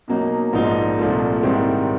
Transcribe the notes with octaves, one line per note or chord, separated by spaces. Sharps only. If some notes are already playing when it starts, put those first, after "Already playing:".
B2 F#3 A#3 D#4
A#1 G#2 F3 A#3 D#4
C2 A#2 F3 A3
G#2 D#3 G3 C4 E4